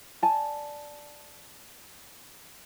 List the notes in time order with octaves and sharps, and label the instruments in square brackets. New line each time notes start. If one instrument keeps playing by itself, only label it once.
[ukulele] D5 G#5 A5